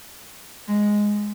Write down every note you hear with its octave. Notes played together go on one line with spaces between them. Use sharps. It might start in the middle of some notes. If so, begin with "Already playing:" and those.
G#3